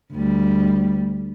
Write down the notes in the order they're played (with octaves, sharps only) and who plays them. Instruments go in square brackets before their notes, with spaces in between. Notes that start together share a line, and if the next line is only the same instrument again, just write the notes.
[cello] D2 G3